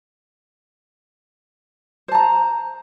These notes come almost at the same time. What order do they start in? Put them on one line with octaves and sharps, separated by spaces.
C5 A5 A#5